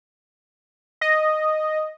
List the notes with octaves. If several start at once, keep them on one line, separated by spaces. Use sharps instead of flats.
D#5